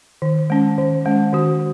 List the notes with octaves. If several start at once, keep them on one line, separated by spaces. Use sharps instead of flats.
D#3
G#3 C#4
D#3
G#3 C#4
D#3 F#4